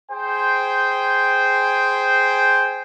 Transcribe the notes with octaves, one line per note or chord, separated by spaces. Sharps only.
G#4 C5 G5